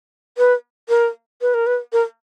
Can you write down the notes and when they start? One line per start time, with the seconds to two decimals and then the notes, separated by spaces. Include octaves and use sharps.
0.38 B4
0.89 A#4
1.42 B4
1.54 A#4
1.67 B4
1.93 A#4